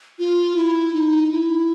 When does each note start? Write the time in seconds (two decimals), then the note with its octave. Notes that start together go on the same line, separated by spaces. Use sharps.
0.19 F4
0.56 E4
0.94 D#4
1.32 E4